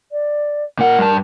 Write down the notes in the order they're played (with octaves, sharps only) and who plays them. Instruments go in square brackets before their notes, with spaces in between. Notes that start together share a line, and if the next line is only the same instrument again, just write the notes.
[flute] D5
[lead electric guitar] A#2 F#5 [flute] A#4
[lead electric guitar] G2 A5